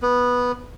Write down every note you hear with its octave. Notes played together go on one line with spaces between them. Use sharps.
B3